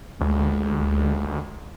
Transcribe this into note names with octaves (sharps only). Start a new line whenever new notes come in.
D2 G#3